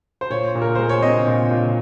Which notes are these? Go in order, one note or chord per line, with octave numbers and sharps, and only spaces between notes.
C5
A#2 C#5
A#2
A#4
G#3 C5
C#5
C4 D#5
A#2
A#2